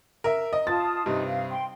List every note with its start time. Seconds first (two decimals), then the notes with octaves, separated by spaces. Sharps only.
0.24 A#4 E5
0.53 D#5
0.67 F4 A5 D#6 A6
1.06 G2 C3 D#4
1.24 F5
1.50 G5 C6